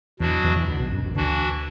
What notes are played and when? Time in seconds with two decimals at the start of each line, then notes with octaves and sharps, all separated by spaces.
0.20 E2 B2 E3 F#3 D4 F#4
0.44 E2 E3
0.56 E3
0.68 D2 D3
0.79 B1 B2
0.92 F#2
1.04 A1 A2
1.15 D2 D3 E3 D4 F#4